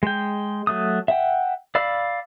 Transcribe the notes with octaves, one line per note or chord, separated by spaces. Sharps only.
G#3 G5
F#3 A3 D#6
E5 F#5 G5
D5 F5 B5 E6